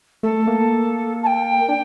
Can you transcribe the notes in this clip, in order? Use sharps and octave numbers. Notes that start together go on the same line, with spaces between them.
A3 A4
A#3
A5
G5
D4